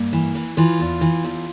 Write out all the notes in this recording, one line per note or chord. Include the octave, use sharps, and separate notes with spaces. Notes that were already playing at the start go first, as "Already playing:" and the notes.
Already playing: G2 A#3
E3
E3
E3 F4
E2
E3
E2